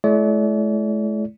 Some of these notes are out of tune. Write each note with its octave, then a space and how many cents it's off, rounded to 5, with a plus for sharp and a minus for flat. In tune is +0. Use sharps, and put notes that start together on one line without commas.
A3 -45 E4 +10 D5 -40